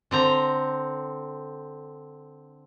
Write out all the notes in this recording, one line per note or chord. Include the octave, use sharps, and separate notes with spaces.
D3 C4 A#5